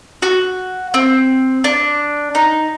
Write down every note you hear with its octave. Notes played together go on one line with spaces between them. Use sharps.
F#4
C4
D4
D#4